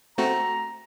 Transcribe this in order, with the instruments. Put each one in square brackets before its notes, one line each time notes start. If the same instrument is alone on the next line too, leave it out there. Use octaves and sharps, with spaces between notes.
[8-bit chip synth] A3 C4 F#4 [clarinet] A#5